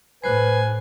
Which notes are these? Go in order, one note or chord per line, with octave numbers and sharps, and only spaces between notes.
A2 B4 C5 G#5